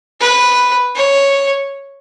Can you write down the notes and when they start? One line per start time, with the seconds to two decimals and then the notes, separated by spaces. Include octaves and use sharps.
0.20 B4
0.96 C#5